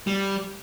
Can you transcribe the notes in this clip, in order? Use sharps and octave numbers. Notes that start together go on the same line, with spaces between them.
G3